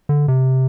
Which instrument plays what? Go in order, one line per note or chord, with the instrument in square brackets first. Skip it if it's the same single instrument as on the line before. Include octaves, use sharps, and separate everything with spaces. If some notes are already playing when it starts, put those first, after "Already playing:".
[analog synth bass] D3
C3